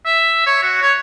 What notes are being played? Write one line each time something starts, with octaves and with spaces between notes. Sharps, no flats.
E5
C#5
F#4
C#5